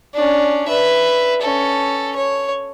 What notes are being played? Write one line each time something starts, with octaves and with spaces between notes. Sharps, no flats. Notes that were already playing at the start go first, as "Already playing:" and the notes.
C#4 D4
B4 E5
C#4 A4
C#5